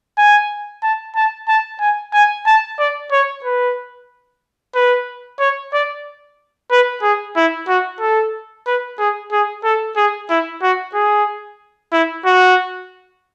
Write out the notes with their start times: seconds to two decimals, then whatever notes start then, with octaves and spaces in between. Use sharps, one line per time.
0.18 G#5
0.83 A5
1.16 A5
1.48 A5
1.80 G#5
2.14 G#5
2.46 A5
2.79 D5
3.12 C#5
3.44 B4
4.75 B4
5.39 C#5
5.73 D5
6.71 B4
7.03 G#4
7.36 E4
7.68 F#4
8.00 A4
8.66 B4
8.99 G#4
9.32 G#4
9.64 A4
9.96 G#4
10.30 E4
10.63 F#4
10.94 G#4
11.93 E4
12.26 F#4